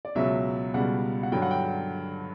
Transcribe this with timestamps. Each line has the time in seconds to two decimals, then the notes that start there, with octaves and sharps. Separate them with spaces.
0.05 D5
0.15 C#2 B2 F#3 E5
0.74 C#2 B2 G3 F#5
1.23 F#5
1.32 G2 D3 F#3 G5
1.42 F#5
1.51 G5